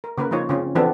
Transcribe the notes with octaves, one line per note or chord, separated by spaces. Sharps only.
A#4
C#3 A#3 A#4 B4
F3 A#3 D#4 F4 C#5
C#3 C4 C#4 F4
E3 F3 B3 C4 D4 A4